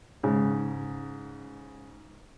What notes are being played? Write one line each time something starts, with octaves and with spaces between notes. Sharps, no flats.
G#2 C#3